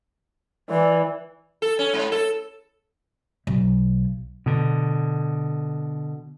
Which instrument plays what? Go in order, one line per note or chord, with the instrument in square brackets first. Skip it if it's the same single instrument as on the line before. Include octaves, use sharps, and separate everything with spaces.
[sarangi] E3 [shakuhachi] D5
[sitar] A4
C#4
G#2
A4
[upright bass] B1
[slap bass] B2 D3